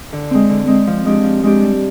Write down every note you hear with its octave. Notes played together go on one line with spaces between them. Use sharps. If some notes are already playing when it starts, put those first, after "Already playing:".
D3
G#3 C4
D3
G#3 C4
F3
G#3 D4 G4
F3
G#3 D4 G4
G3